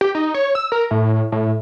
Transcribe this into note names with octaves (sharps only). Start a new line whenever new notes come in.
G4
D#4
C#5
E6
A#4
A2
A2